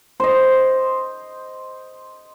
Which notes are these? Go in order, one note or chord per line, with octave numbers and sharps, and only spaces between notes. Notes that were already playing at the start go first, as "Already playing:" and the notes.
C5 D#5